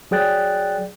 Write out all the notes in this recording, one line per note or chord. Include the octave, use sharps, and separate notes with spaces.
F#3 G#4 D5 G5 F#6 A6